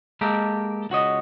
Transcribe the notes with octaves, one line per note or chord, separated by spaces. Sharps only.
G#3 A#3 G4 A4 A#4
C#2 F#4 C#5 D#5